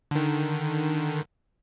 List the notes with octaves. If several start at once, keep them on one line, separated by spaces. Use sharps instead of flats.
D3 D#3